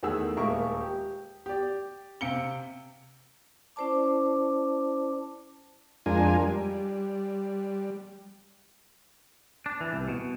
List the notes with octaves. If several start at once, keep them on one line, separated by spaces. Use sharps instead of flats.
E2 D#3 A3 G#4 F#5 E6
D#1 G#3 A#3 A#4 E5 C#6
G4
G4 D5
C3 F5 C#7 D7 G7
C#4 E4 C5 D5 A5 D6
F2 G#3 D4 F4 A#4 G#5
G3
D4
E3
C2
B2